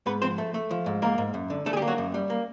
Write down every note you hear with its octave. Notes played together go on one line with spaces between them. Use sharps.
G#2 B3 B4
F3 C4 C5
A3
A3
F3
G#2
G#2 A#3 A#4
G#2
F#2
D3
D3 A3 A4
G#4
G3 G4
A#3
F#3 F#4
F#2
G3
A#3